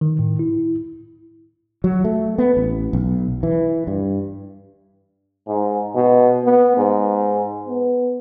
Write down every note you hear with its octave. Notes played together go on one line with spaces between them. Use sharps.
D#3
A2
E4
F#3
A3
B3
A1
B1
E3
G2
G#2
B2
B3
G#2
B3